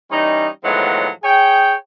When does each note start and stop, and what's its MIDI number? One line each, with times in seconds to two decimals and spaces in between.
0.10 0.48 52
0.10 0.48 55
0.10 0.48 61
0.10 0.48 63
0.63 1.09 45
0.63 1.09 51
0.63 1.09 53
0.63 1.09 54
0.63 1.09 56
0.63 1.09 59
1.23 1.75 68
1.23 1.75 73
1.23 1.75 79